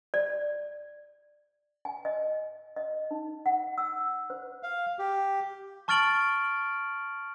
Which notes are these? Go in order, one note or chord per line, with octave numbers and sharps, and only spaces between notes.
D5
G#5
D#5
D#5
D#4
F#5
E6
C5
F5
G4
A5 C#6 F6 A6 D7 F#7